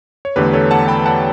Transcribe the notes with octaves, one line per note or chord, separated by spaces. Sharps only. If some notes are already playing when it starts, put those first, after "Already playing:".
C#5
E2 D3 A3 G4 B4
A4 C#5
F#5 A5
G5 B5
F#5 A5